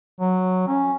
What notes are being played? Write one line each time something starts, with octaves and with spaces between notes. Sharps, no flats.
F#3
C#4